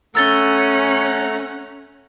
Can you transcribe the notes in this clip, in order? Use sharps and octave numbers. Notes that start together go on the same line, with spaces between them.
A3 C#4 F#5 A#5 E6 A6 G7